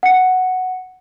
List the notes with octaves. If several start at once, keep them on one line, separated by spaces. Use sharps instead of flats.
F#5 C#7